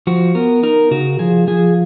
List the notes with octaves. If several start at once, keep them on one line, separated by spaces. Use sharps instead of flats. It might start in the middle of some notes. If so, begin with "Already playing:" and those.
F3 F#4
B3 A#4
D#4 A#4
C#3 F#4
F3 G#4
F3 G#4